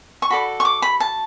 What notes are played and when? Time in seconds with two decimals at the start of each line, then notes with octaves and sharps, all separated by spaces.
0.22 C#6
0.30 F#4 A4 D5 B5
0.60 C#6
0.65 D6
0.82 B5
1.00 A5